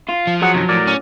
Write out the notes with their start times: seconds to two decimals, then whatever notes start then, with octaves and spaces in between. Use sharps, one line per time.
0.09 F4
0.27 F3
0.42 F#3 G#4 F#5
0.54 F#2 C3 D#3
0.69 A2 A#4 D5
0.87 C#4